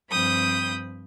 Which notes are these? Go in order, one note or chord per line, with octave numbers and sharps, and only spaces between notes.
G2 F3 C4 B5 D#6 G6